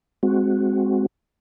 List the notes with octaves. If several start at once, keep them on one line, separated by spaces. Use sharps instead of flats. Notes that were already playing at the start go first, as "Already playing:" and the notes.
G#3 C4 F#4